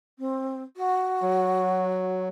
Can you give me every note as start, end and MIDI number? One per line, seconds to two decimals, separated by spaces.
0.19 0.63 60
0.77 2.23 66
1.22 2.29 54